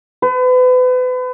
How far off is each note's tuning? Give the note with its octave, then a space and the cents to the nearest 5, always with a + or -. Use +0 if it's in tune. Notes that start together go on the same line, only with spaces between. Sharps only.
B4 +35